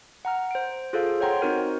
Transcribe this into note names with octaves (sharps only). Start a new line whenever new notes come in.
F#5 A#5 F6
C5 D7
F4 G#4 A4 C5 F5
C5 C#5 F#5 G5 A#5 C6
C4 D#4 F#4 A#4 C5